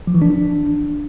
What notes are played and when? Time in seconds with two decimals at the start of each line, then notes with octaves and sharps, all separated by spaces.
0.07 F3
0.15 E3
0.22 D4